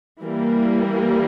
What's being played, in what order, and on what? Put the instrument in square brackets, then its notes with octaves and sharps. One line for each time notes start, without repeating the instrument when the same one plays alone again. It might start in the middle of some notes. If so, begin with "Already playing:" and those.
[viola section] E3 G3 A#3